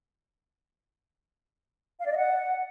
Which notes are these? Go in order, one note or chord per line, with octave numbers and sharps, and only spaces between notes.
F5
D5
D#5
F#5